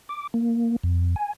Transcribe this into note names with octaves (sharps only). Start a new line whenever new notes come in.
D6
A#3
F2
G#5